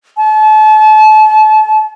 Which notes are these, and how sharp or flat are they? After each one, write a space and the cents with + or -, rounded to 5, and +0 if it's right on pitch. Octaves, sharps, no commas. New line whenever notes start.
A5 -35